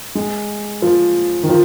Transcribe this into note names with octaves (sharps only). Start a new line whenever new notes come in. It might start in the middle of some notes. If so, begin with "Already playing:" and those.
G#3
F3
D#3
F3